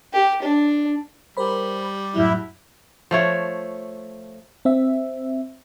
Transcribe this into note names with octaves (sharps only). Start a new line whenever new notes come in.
G4
D4
G3 A#4 C5 B5
F#2 A2 F#3 E4
F3 A3 C#5
C4 E5